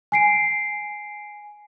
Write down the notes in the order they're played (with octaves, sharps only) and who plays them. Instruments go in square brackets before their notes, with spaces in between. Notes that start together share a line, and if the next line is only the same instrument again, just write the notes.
[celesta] G#5 C7 D7